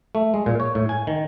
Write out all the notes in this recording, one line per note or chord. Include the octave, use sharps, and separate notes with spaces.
A3
G#3
A#2
C#5
A2
G#5
D#3